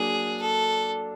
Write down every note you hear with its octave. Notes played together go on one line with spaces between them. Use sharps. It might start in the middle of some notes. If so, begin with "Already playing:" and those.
Already playing: F#3 A#3 D4 G#4
A4